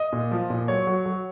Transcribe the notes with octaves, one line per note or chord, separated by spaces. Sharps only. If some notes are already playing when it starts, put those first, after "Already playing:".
Already playing: D#5
A#2
F3
A#2
F#3 C#5
F#3
F#3